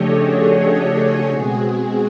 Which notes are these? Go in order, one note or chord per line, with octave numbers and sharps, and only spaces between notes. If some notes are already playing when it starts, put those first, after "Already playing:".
Already playing: C#3 F3 A3 D4 G4 A4 C#5 D#5
F#4 G#4
G4 A4
B2 G#3 C4 F#4 G#4